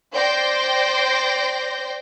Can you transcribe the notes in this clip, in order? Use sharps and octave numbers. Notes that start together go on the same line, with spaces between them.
C5 D5 G5 C6 G6 A#6